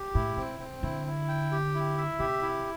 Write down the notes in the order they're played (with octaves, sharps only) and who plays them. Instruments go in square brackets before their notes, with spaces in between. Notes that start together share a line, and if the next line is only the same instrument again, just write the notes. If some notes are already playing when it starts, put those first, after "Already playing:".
Already playing: [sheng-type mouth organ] G4
[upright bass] A2 [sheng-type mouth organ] E4
[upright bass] C3 [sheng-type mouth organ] C4
[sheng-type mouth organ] C4
[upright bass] D3 [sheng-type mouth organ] E4
[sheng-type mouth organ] E4
G5
G4
E4
E5
[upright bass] C3 [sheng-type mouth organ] G4
[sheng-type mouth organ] E4